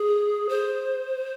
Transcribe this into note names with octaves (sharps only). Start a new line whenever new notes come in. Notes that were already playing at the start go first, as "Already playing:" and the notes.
Already playing: G#4
C5